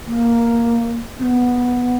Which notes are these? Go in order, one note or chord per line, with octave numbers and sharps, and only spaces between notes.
A#3
C4
B3